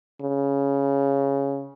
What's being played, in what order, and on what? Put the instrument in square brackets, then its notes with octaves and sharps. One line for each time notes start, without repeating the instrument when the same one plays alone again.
[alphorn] C#3